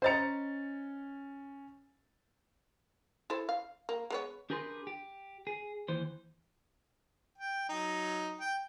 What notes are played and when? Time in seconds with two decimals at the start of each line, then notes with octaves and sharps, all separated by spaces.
0.02 C#4 C5 D#5 A#5 A6 C#7
3.30 E4 A4 C5
3.49 F5
3.89 A#3
4.10 G#3 B3 C#5
4.50 D4 G4 G#4 A#4 B4 C6
4.87 G4
5.47 G#4
5.88 D#2 E3 C5
7.38 G5
7.69 F#3 D#4
8.41 G5